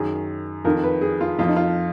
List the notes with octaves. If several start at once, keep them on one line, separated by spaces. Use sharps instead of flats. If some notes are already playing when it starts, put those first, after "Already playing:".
Already playing: F#2 D#3 G#4
F2 D#3 A#4
B4
G#4
F4
F2 F3 F4
D#4
F4